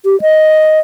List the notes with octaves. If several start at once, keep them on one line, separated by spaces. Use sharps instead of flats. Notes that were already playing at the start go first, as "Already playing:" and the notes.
G4
D#5